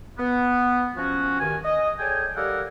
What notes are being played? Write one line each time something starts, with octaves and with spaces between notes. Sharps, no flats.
B3
F3 C#4 F#4
G2 D#3 G#5
D#5
G#4 A4 C#5 D5 G5 G#5
G3 D4 A4 A#4 F5 F#5